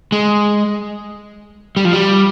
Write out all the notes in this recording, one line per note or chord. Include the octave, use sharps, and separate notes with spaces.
G#3
G3
F3
G3